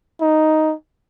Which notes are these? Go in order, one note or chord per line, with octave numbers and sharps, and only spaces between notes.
D#4